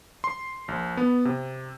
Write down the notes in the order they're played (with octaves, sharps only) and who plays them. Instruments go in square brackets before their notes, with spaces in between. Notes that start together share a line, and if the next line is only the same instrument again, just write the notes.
[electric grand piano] C6
A#1
B3
C3